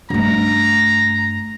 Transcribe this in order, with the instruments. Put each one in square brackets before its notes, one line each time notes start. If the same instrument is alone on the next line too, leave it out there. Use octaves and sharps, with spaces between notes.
[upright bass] G2 A3 [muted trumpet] A#5